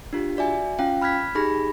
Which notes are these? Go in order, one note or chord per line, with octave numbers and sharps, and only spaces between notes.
D4 F4 G4
F#4 D5 E5 G#5
C#4 F4 F5 G5
B5 F6 F#6 G#6 B6
D#4 G4 G#4 B5 A#6